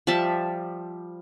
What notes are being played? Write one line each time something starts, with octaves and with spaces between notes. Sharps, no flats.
F3 G3 E5 A5